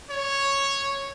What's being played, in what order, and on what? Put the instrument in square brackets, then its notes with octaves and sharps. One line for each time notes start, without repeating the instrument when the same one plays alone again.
[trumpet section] C#5